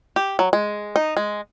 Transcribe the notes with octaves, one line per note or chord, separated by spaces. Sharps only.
G4
F#3
G#3
D#4
G#3